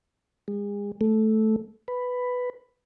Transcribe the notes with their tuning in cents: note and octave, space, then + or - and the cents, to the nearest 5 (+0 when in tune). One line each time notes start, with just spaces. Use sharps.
G#3 -35
A3 -10
B4 +5